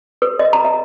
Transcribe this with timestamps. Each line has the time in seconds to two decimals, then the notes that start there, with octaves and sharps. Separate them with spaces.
0.22 B4
0.39 D#5
0.53 A#5
0.65 E5